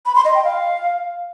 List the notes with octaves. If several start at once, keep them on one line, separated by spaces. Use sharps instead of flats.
B5
C6
D#5
G5
F5